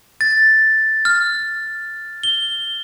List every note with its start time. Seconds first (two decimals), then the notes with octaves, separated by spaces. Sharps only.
0.21 A6
1.05 F6
2.23 G7